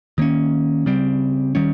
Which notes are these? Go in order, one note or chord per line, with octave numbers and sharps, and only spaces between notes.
D#3 A#3 C#4
C#3 G3 C4
D#3 G3 C#4